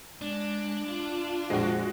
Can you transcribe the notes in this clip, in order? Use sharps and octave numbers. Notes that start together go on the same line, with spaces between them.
G#3 D4
F4
A#1 F2 G#3 F#4 C5